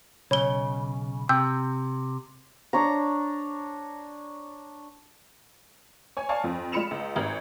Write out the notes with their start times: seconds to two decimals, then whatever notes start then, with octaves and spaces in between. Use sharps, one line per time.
0.31 B1 C#3 C#5 G7
1.29 C3 G5 E6 G6
2.73 D4 C#5 A#5
6.17 C#5 G#5
6.29 D5 F5 G#5 A5 C#6
6.44 F2
6.72 G#3 F4 B5 C#7 E7 F7
6.91 C#2
7.16 G#1